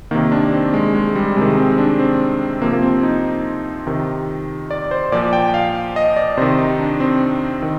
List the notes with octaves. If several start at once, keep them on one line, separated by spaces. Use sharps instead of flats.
C3 D#3 A#3
D4
C4
G#3
G#3
G3
C3 D#3 G#3
C4
D4
C4
C3 F3 A#3
A#3
C4
D#4
C3 D#3
D5
C5
A#2 F3 D5
G5
F5
D#5
D5
C3 D#3 C5
D#4
D4
C4
D#3